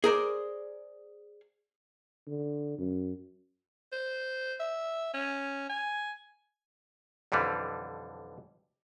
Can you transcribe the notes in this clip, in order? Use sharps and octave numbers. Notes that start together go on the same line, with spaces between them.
G#4 A#4 C5 D5
D3
F#2
C5
E5
C#4
G#5
B1 F2 D3 E3 G3